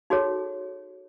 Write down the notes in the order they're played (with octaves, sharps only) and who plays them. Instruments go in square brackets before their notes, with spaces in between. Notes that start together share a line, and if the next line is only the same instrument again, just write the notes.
[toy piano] D#4 F#4 G#4 A4 C#5